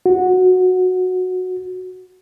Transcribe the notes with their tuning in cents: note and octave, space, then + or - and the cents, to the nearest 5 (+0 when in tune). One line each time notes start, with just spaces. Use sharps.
F#4 -10